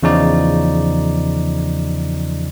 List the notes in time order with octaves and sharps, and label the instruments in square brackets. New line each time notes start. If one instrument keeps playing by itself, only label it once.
[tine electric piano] E2 C#3 F3 D#4 D5